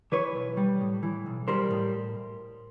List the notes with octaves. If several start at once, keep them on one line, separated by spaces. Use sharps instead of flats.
E3 B4 C#5
B1
G3
A2
E3
B1
G3 A#4 C5
A2